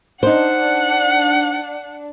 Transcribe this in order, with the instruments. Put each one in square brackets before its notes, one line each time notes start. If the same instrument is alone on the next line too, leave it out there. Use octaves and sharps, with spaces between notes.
[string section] D4 [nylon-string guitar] D#4 C5 [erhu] F#5